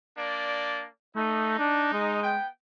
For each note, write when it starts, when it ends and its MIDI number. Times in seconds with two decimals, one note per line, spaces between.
0.17 0.88 58
0.17 0.88 62
0.17 0.88 74
1.16 1.57 57
1.16 2.20 63
1.59 1.91 62
1.93 2.36 56
2.22 2.48 59
2.22 2.48 79